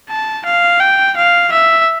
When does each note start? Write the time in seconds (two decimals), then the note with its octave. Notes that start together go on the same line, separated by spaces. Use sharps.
0.10 A5
0.46 F5
0.80 G5
1.17 F5
1.52 E5